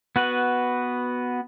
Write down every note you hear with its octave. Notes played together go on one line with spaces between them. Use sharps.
B3 F#4 B4